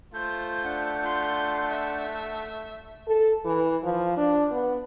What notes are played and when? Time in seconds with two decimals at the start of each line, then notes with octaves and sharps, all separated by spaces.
0.14 A3 F4 C5 G6
0.64 D4 F#5
1.03 F4 C6
1.71 E5
3.08 A4
3.45 E3
3.84 F3
4.17 D4
4.51 B3